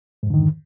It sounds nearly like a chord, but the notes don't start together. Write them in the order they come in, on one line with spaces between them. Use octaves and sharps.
G#2 F2 D3 D#3